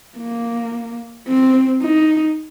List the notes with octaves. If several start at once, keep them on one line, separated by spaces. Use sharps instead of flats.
A#3
C4
D#4